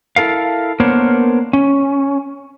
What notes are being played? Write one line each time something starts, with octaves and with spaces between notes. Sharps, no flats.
E4 A4 A#4 F5
A#3 B3 D4 A#4 C5 C#5
C#4